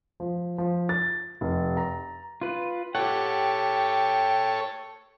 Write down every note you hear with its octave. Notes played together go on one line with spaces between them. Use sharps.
F3
F3
A6
F1
A#5
F4 B4
G4 A4 C#5 F#5 G5